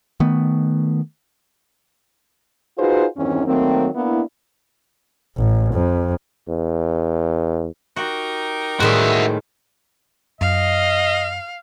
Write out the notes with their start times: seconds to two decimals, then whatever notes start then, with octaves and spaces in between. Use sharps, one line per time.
0.20 D#3 A3 B3
2.79 D#4 F4 F#4 G#4 B4 C5
3.17 E2 G2 D#3 E3 C4 C#4
3.46 D#3 F#3 A3 A#3 C4
3.95 A#3 B3 D4 E4
5.37 A1
5.74 F2
6.49 E2
7.96 D#4 F#4 G4 A#4
8.80 A2 D#3 G3 G#3 C4 F#4 E5
10.41 F#2 D#5 F5